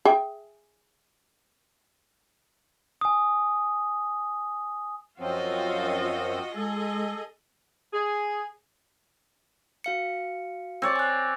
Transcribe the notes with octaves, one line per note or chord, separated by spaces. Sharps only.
G#4 E5 G5
G#5 D#6
F#2 F3 C4 F4 F#4 C#5 D#5
G#3 G#4 A4 D#5
G#4
F#4 F5 C#7
C4 C#5 D5
G#5 F#6